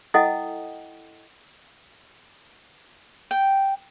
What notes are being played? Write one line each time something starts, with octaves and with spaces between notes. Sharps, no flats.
E4 A4 D#5 F#5 G5 D#6
G5